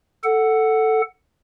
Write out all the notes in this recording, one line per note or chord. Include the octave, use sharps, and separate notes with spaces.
A4 F#5